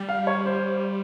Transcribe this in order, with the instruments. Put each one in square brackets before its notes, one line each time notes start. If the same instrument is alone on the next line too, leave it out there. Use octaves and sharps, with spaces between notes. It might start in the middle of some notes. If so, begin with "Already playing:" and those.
Already playing: [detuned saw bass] G3
[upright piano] F5
C#5
C5